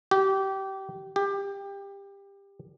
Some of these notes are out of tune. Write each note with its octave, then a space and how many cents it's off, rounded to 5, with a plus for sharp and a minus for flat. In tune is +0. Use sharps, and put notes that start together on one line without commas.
G4 -25
G4 +20